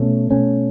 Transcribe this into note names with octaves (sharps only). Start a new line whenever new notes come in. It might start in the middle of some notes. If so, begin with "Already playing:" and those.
Already playing: B2 A3 C#4
B2 A3 C#4